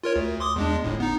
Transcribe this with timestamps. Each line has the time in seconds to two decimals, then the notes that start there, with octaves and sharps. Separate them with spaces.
0.04 F4 A#4 C#5
0.16 D2
0.40 C6 D6 D#6
0.56 E2 G#3 D4
0.84 G1 A2
1.00 B3 D#4